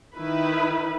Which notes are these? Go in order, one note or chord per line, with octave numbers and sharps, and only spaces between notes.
D#3 E4 B4